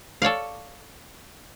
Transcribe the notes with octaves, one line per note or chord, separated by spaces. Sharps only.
A4 C#5 D5 F5